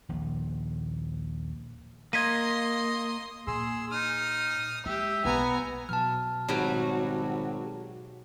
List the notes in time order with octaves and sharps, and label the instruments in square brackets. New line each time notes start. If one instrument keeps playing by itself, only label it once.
[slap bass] D#1 A#1 D#2 A#2
[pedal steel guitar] A#3 [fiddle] D#5 C6 [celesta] G#6 B6 D#7
[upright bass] A#2 [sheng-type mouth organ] G#4 C6 E6
[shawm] D#4 [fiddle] D#6 [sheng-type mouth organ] F6
[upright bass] G#3 [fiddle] G4 [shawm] E5
[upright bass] B1 [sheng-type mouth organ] B3 [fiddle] G#5 A#5
[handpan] B2 F#3 [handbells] A5 F6
[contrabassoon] G#1 [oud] F#3 G3 [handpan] F#4 C#5